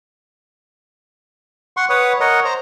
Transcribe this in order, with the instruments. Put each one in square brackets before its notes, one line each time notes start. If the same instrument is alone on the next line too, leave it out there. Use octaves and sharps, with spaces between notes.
[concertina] F#5 C6 C#6
B4 C#5 F#5 D#6
A#4 C#5 D#5 F#5
C5 A#5